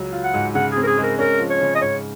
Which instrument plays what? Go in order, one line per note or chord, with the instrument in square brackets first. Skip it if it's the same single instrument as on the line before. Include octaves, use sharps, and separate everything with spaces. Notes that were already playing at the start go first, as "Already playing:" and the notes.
Already playing: [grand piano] C#2 F#3
F4
[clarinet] F#5
[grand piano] G#2
[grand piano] C#3 [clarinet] F#5
[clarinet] G#4
[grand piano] C4
[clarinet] A#4
G#4
[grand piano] G#3
[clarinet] A#4
[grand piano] C#4 [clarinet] A#4
[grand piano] F3
[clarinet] C#5
[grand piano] C#3
[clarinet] D#5
[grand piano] G#2 [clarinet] C#5